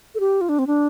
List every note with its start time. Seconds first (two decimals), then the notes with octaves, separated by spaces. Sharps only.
0.15 A4
0.20 G4
0.41 F4
0.49 D4
0.59 C4
0.67 D4